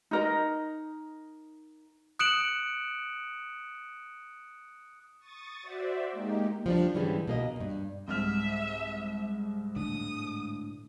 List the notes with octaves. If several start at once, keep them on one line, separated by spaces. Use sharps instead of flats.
D#4 A#4 D#5
D#6 F#6 C#7 D7 E7 F#7
C#6 D#6 A6
F#4 C5 D5 E5
G#3 A#3 D#4 G4
F3 G3 C4 D4
G#2 D3 E3 G3 C#4 G#4
B2 A#3 D#5
E2 G2
C2 G#2 E5 F6
A2 D3 D#6